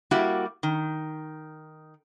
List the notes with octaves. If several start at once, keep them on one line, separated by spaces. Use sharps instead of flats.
G3 A#3 E4 F#4 G4
D#3